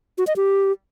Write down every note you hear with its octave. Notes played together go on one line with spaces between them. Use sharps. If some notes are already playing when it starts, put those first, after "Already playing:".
F#4
D#5
G4